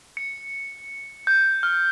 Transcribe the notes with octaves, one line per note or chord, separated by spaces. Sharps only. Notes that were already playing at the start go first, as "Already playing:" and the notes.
C#7
G6
F6